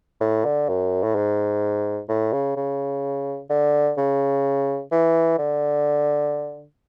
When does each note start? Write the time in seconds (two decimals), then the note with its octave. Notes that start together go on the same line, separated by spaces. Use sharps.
0.21 A2
0.45 D3
0.68 F#2
1.03 A2
1.15 G#2
2.09 A2
2.33 C#3
2.56 C#3
3.50 D3
3.97 C#3
4.92 E3
5.38 D3